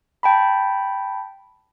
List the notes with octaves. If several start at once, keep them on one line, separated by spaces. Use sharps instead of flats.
G5 A5 B5